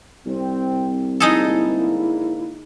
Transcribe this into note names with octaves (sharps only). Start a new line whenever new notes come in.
C2 C4
G#2 D3 A#3 D#4 E4 G#4 A4